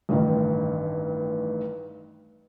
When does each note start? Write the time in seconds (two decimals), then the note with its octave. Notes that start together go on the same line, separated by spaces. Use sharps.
0.09 A1 G2 D#3